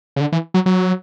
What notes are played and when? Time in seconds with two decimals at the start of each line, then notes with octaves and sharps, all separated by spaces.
0.16 C#3
0.21 D3
0.32 E3
0.54 F#3
0.66 F#3